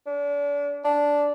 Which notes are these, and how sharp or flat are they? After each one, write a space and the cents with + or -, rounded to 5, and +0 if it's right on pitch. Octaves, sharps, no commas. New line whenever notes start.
D4 -35
D4 -10